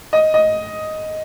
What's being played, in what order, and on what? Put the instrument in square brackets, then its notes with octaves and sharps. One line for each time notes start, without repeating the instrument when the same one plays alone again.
[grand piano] D#5
D#5